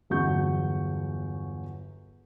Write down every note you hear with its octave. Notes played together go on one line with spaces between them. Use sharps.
G1 E2 F#3 C#6 G6